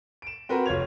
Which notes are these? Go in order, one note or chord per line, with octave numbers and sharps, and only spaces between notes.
D7 E7
C4 F#4 A#4 B4
F1 F4 C#5 G#6 F7